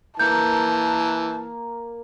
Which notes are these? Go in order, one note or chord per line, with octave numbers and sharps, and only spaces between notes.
E3 A#3 A#4 A5 G6